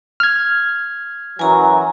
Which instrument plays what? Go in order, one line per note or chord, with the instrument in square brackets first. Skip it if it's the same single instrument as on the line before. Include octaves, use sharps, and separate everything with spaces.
[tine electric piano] F6 G#6
[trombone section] F#2 E3 F#3 [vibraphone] G#5 A#5